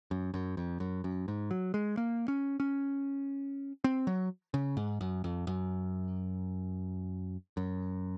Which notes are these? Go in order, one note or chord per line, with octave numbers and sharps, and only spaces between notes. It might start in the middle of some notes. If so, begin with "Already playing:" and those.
F#2
F#2
F2
F#2
F#2
G#2
F#3
G#3
A#3
C#4
C#4
C4
F#3
C#3
G#2
F#2
F2
F#2
F#2